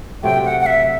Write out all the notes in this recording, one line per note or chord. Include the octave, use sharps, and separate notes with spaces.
C3 F#3 A3 G5
F#5
F#5
E5